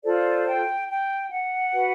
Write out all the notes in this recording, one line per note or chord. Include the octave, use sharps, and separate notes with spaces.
F4 A4 C5 D5
G5
G5
F#5
F#4 B4